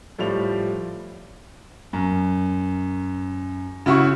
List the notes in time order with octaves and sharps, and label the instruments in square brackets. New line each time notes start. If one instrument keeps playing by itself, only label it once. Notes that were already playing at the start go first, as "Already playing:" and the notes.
[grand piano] A2 F3 G3 F7
F#2
C#3 E4 F#4 C#6